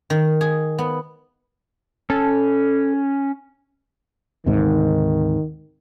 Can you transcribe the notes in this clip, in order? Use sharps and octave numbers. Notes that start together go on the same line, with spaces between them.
D#3
G#4
B3
C#4 A4
D2 G#2 C3 D#3